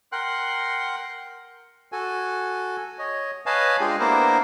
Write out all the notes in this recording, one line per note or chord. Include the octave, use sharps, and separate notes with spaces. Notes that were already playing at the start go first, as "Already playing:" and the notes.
A#4 F#5 G5 C6 F#6
F#4 A4 G#5
C#5 D#5
B4 C#5 D#5 F5 G#5 A5
G#3 D4 F4 G4 G#4
A#3 B3 D4 E4 A#4 C5